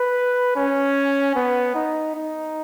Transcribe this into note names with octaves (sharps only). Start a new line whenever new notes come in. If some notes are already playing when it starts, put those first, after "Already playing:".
Already playing: B4
C#4
B3
D#4
D#4